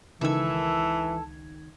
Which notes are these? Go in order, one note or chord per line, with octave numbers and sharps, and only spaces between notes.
C#2 D#3 E3 A4 E6 G#6